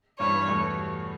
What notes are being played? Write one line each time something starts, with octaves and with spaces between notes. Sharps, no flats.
G2 E3 G3 C#5
E2 B2 A3